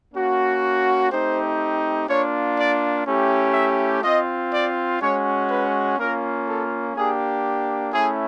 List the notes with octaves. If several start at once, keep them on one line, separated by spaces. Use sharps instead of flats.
A#3 C#4 F#4
A3 C4 D#4 G4 C5
A#3 D4 F4 C#5
D5
A3 C#4 E4 G4
E5
C4 F4 D#5
D5
G#3 C#4 F#4 C#5
B4
A#3 C#4 F4 A#4
A4
A#3 D4 G4 G#4
A3 C#4 E4 G#4